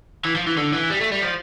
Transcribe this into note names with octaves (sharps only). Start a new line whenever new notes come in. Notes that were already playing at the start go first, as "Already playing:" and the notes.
E3
F3
E3
D3
E3
G3
A3
G3
F3